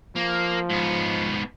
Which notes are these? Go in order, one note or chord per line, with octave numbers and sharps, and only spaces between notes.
F3 A#3
G#2 B3